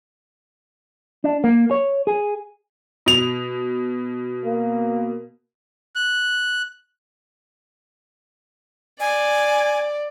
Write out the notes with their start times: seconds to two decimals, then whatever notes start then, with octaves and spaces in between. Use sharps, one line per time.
1.24 D4
1.44 A#3
1.71 C#5
2.07 G#4
3.06 B2 F7
4.45 A#3
5.95 F#6
9.00 D5 G#5